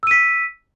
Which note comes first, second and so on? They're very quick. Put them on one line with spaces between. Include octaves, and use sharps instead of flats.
E6 D#7 B6